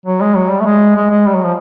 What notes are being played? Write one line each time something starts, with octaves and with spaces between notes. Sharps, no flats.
F#3
G#3
F#3
G3
A3
G#3
G#3
G#3
G3
F#3
F3